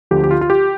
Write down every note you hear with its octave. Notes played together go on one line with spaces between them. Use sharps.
D2 D3 F3 G4
G4
F4
F4
G4